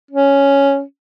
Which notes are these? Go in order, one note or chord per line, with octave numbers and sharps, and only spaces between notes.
C#4